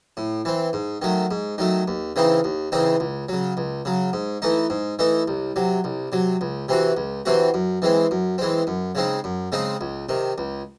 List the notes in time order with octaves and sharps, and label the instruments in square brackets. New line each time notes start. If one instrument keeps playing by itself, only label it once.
[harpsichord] A2
E3 C4
G#2
D#3 F#3 A3
G#2
D#3 F#3 A3
D#2
C#3 E3 C4 D#4
D#2
C#3 E3 C4 D#4
C#2
C#3 F#3
C#2
C#3 F#3
G#2
E3 A3 D#4
G#2
E3 A3 D#4
C2
C3 F#3
C2
C3 F#3
C#2
C3 E3 C4 F#4
C#2
C3 E3 C4 F#4
F#2
E3 G#3 C4
F#2
E3 G#3 C4
F#2
C#3 G#3 C4 D#4
F#2
C#3 G#3 C4 D#4
C#2
C3 D#3
C#2